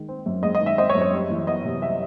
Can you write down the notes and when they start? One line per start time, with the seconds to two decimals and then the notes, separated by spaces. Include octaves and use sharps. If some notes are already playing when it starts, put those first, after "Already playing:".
Already playing: D#3 G#3
0.09 C4
0.26 F#2
0.43 G#3 D#5
0.55 D#5
0.61 D#3
0.66 E5
0.78 C4 D#5
0.90 C#5
0.95 F#2
1.01 C#5
1.13 G3
1.30 E3
1.47 B3 D#5
1.65 C3
1.82 G3 E5